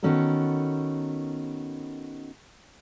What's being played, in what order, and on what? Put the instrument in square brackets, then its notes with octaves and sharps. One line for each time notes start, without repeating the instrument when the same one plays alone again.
[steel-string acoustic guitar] D#3 B3 C#4 F#4 A4 A#4